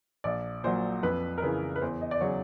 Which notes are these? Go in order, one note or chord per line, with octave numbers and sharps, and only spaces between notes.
A#1 D5
A#2 F#3 C5
F2 B4
A#4
C#3 E3 B4
B4
E2 C5
D#5
D5
C#3 F#3 C#5